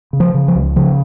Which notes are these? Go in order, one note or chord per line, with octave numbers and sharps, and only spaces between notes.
C#3
F3
C#3
F3
C#2
C#3 F3